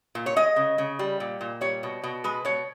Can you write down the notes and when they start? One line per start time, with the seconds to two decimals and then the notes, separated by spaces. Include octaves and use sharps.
0.15 A#2
0.26 C#5
0.36 G#3 D#5
0.56 C#3
0.78 C#3
0.99 G3
1.20 A#2
1.41 A#2
1.61 G3 C#5
1.83 B2
2.04 B2
2.24 G#3 B4
2.45 B2 C#5